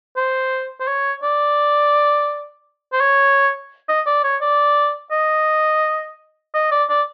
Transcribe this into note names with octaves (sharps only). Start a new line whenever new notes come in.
C5
C5
C#5
D5
C5
C#5
D#5
D5
C#5
D5
D#5
D#5
D5
D5